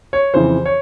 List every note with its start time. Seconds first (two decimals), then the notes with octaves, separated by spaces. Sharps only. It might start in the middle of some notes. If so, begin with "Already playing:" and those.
0.13 C#5
0.34 F2 C#3 E3 C5
0.65 C#5